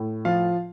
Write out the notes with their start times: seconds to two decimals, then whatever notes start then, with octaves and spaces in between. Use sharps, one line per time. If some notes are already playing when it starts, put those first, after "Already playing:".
Already playing: A2
0.25 F3 F4 F5